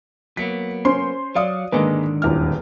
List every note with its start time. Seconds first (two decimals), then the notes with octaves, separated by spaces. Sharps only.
0.37 F#3 A#3 B3 B6
0.85 C#4 C5 C6
1.35 F#3 D5 F5 D#6
1.72 G#2 D3 D#3 G#3 A#3 B4
2.22 D#1 E2 F6